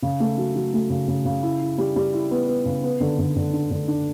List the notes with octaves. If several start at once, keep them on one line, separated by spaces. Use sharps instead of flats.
C#3
A3
F#3
F#3
A3
C#3
C#3
C#3
E4
E4
G3
G3
E4
B3
B3
C#3
B3
D3
D3
D3
D4
D3
D4